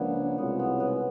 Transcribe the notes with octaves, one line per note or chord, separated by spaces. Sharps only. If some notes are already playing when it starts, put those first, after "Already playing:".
Already playing: C#2 C#3 F3 A#3 B3 D4 E4
C2 B2 G#3 B3 C#4 F4
B3
B3